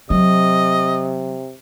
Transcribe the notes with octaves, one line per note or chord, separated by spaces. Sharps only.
C3 F#3 D#5